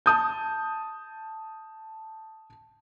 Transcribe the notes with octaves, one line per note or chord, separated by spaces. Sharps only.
A5 D#6 G6